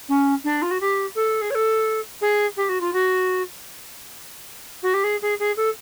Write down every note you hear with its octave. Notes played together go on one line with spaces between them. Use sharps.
C#4
D4
F4
F#4
G4
A4
G#4
C#5
A4
G#4
G4
F#4
F4
F#4
F#4
G4
G#4
G#4
G#4
A4